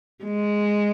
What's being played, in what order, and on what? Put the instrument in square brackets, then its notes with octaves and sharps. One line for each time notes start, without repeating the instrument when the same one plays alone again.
[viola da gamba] G#3